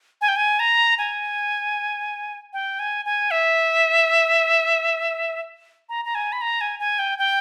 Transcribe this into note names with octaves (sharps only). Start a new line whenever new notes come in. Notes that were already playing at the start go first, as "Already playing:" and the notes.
G#5
G5
G#5
A#5
G#5
G5
G#5
G#5
E5
A#5
A#5
G#5
B5
A#5
G#5
G#5
G5
G5